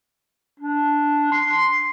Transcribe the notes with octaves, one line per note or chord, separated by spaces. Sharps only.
D4
C6